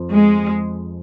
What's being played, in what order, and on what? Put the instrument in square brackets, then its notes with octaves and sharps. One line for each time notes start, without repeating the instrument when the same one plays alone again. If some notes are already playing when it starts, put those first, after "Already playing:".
Already playing: [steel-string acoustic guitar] F2 F3
[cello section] G#3